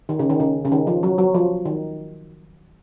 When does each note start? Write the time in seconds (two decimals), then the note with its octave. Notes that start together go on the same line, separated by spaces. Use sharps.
0.09 D#3
0.19 C#3
0.30 D#3
0.40 C#3
0.65 C#3
0.72 D#3
0.87 F3
1.03 F#3
1.18 F#3
1.35 F3
1.65 D#3